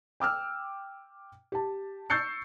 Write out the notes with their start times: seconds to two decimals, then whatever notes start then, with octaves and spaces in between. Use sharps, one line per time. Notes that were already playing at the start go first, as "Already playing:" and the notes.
0.20 G5 D6 E6 F6
1.52 G4 A5
2.10 C#6 E6 G6 A6 C7 C#7